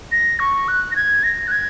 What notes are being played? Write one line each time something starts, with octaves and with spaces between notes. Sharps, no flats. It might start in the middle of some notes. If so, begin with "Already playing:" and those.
A#6
C#6
F#6
A#6
G#6
A#6
F#6
G#6